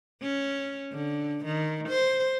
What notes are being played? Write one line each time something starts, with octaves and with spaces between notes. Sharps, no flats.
C#4
D3
D#3
C5